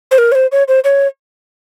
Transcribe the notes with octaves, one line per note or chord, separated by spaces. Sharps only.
C5
A#4
C#5
C5
C#5
C5
C#5